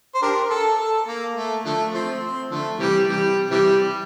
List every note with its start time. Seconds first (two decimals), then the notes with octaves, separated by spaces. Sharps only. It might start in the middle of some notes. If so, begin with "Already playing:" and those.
0.14 C5
0.22 D4 G4 A#4
0.50 A4
0.79 A4
1.08 A#3
1.36 A3
1.65 D3 F3 A3
1.94 F3 A3 C4
2.23 C4
2.51 D3 F3 A3
2.79 C3 E3 G3
3.08 C3 E3 G3
3.51 C3 E3 G3